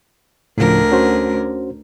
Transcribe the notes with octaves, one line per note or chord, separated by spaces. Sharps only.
D2 A2 C#3 F3 A#4
C#4 F#4 C5